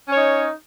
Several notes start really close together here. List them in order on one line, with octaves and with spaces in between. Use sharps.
C#4 C#5 D#4